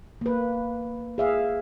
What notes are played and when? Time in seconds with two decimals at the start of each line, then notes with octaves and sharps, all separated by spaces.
0.21 A#3 B4
1.18 G#4 E5 F5